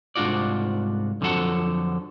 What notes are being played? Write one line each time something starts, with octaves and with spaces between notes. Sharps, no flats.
C2 G#2 D4 F4 F#4 D5
F2 D3 F3 F#3 A4 F#5